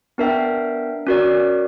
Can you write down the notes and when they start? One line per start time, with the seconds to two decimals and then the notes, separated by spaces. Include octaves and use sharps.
0.18 B3 D4 A#4 E5 G5
1.07 C#4 F#4 A#4 D5